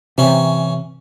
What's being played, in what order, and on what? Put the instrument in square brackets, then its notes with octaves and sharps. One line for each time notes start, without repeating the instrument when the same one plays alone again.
[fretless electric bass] C3 [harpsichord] E3 C#4